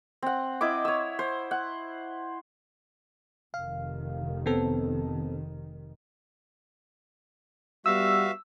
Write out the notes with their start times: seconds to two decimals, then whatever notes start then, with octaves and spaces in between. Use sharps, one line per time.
0.23 C4 F#5
0.61 E4 D#5 D6
0.85 C#5 E6
1.19 C5
1.51 F#5
3.54 F1 D#3 F5
4.46 B3 C4 A4
7.86 G3 B3 F#4 E5 F5 E6